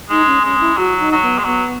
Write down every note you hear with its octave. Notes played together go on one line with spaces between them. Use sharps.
G#3 D#4
C#4
G#3 C#4
E4
F#3 F#4
D#4
F#3
B3
G#3
F#3 B3